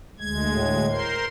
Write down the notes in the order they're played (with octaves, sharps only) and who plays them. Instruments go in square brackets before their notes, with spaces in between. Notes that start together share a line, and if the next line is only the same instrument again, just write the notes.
[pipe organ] D2 G#3 G#6
[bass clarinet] A2
[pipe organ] A#4 C5 C6